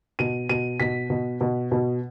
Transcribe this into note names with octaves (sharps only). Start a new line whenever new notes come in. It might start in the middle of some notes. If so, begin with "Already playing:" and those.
B2 D#7
B2 D#7
B2 B6
B2
B2
B2